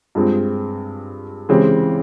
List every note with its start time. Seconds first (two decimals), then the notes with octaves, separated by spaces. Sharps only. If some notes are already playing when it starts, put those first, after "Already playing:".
0.15 G2 F3 G#3 C4
1.49 C#3 E3 G#3 C4 G4